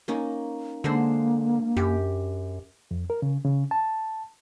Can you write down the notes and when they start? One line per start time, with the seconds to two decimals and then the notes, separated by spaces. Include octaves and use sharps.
0.08 A#3 C#4 D#4
0.84 D3 G#3 A#3 D4 C5
1.77 F#2 G4
2.91 F2
3.10 A#4
3.22 C#3
3.45 C#3
3.71 A5